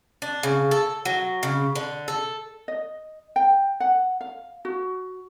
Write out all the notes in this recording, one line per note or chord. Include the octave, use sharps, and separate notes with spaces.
D4
C#3
A4
F#3
C#3
D3
A4
D#5
G5
F#5
F5
F#4